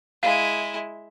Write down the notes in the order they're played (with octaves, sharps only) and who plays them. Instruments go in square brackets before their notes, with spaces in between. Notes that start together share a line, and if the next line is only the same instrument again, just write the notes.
[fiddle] G#3 E4 [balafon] F5